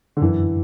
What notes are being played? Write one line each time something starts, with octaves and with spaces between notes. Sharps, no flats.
D3
F#2 E3